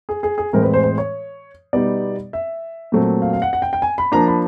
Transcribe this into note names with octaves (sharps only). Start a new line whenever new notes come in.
G#4
G#4
G#4
A2 E3 G#3 C4 A#4
B4
C5
C5
C#5
B2 G3 B3 D#4 D5
E5
A#2 F#3 A3 C4
F5
F5
F#5
F#5
G5
G5
G#5
B5
F3 A#3 D4 A#5
B5